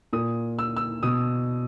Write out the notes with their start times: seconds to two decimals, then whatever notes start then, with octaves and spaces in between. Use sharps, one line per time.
0.13 A#2 D#6
0.59 E6
0.76 E6
1.03 B2 D#6